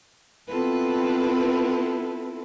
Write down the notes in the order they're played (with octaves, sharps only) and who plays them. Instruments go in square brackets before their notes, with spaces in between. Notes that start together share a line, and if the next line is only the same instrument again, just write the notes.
[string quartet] B3 C4 E4 F4 A4 B4